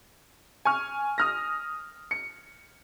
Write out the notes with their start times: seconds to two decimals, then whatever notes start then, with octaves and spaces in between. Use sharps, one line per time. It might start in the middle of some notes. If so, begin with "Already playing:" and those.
0.65 G#5 C#6 F6
1.18 D#6 F6 A#6
2.11 C#7